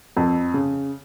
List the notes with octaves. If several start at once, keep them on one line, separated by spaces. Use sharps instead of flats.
F2
C#3